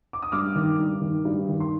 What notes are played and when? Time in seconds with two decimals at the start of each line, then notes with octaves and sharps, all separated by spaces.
0.13 D6
0.22 D#6
0.32 G2 D6 F6
0.56 D#3
0.79 G2
1.02 D#3
1.25 G2
1.49 D#3
1.60 C6